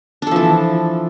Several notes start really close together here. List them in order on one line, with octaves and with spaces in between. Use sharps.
D4 A4 F3 E3